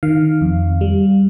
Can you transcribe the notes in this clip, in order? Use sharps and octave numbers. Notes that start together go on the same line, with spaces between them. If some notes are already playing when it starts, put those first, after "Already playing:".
D#3 F5
F2
G3